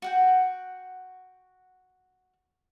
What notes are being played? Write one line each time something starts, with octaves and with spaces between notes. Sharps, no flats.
F#4 F#5 G5